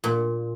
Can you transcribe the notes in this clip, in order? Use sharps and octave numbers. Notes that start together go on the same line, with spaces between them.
A#2